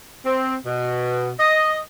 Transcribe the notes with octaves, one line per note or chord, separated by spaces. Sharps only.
C4
B2
D#5